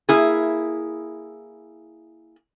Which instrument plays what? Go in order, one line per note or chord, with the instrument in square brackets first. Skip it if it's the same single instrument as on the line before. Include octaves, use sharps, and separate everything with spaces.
[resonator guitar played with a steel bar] A#3 E4 G#4